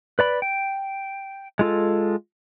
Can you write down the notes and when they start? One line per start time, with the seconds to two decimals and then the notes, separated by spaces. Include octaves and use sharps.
0.19 B4 D5 B5
0.42 G5
1.59 G#3 F4 A4